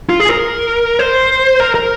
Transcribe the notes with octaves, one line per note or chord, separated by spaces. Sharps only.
F4
G#4
A#4
C5
A#4
A#4